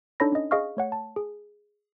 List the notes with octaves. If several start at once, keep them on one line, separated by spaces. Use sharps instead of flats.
D4 D#4 A4 C#5 B5 A#6
C#4 D#5
G#4 D#5 F5 C#6 F6
A3 C#5 F#5
A5
G#4